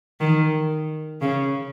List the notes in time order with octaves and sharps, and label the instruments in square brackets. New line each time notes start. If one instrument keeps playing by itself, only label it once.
[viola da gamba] D#3
C#3